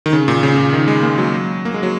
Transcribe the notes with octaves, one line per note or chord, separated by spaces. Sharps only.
D#3
C#3
A#2
C#3
A#2
D#3
G#3
A#3
F#3
A#3
G#3
F#3